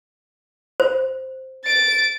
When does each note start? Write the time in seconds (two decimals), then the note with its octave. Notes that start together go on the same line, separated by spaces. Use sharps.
0.80 C5
1.64 A6 D7